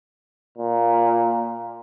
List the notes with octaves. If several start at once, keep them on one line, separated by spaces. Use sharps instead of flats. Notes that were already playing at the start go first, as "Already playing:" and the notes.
A#2